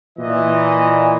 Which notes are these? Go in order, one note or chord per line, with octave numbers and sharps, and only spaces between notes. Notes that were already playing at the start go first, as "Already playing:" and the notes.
A#2 E3 D#5